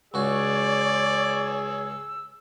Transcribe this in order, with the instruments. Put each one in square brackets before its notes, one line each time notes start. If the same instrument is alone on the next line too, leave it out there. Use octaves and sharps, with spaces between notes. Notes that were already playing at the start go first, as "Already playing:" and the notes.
[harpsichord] C#2 F#4 [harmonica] G#4 E6 [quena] C#5 [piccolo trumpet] D5